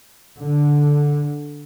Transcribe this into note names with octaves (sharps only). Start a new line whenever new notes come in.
D3